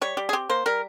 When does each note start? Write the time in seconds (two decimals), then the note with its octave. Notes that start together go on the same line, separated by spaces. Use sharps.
0.01 G3 C#5
0.17 G3 G4
0.29 G#4
0.33 C4 G4
0.49 A#3 C5
0.66 G3 A#4